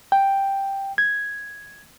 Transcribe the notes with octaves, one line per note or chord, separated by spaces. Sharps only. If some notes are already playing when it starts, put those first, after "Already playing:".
G5
G#6